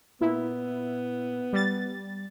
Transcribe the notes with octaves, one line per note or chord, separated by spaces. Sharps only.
A#2 B3 E4
G3 A6